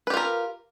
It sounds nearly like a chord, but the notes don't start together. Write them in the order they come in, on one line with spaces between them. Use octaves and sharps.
B4 G4 F4 A#4